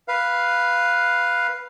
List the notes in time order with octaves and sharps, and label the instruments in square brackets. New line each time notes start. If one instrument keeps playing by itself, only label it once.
[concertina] B4 F5